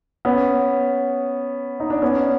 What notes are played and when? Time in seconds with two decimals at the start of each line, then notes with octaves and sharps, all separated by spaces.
0.25 B3 C#4
1.80 D#4
1.90 D4
2.02 B3 C#4